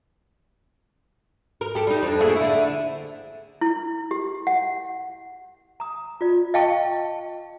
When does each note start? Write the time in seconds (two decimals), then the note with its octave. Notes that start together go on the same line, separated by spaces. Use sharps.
1.61 A#4
1.75 G4 A4
1.87 G3 D#4
2.03 F2 D4
2.20 A3 A#3 G#4
2.36 D3 E4
3.61 E4
4.11 G4
4.47 F#5
5.80 A#5 D#6
6.21 F4 D5
6.54 D#5 F5 G5 A5 C#6